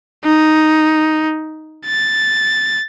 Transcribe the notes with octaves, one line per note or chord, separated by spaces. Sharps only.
D#4
A6